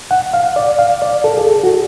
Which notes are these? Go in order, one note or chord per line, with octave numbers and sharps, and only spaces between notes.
F#5
F5
D5
F5
D5
A4
G#4
A4
F#4